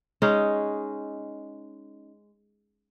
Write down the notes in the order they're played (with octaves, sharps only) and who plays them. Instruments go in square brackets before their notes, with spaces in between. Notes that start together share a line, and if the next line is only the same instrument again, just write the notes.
[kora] G#3 C#4 D#4